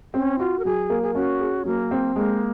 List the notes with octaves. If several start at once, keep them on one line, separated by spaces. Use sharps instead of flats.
C4 C#4
F4 F#4
A#4
F#3 G#4
A#3
G#4
C#4 F#4
G#4
F#3 A#3
C4
G#3 A#3